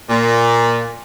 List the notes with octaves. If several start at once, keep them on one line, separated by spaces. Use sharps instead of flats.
A#2